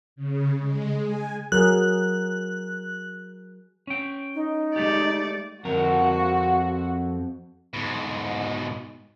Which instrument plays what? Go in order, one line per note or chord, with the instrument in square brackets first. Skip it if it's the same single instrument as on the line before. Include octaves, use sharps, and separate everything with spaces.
[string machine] C#3
G#3
G#5
[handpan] F#3 G#4 A#4 [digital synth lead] F#6
[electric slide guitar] C#4 G5
[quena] D#4
[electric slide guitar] G#3 A3 G4 [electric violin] D5
[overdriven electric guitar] F2 A#4 [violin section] F#4
[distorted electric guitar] G#2 B2